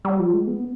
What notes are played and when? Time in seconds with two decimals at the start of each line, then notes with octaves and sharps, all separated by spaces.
0.05 G3
0.19 F3
0.33 G#3
0.47 B3